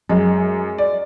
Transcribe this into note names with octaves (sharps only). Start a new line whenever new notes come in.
F#2 G#3
D5